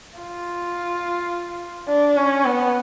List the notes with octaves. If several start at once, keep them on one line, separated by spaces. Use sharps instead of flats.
F4
D4
C#4
B3